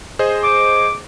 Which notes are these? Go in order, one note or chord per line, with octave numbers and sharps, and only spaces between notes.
G#4 C5 D#5
D6